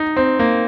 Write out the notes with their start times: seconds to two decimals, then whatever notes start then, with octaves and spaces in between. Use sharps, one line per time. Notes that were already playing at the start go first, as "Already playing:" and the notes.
Already playing: D#4
0.16 C4
0.39 A#3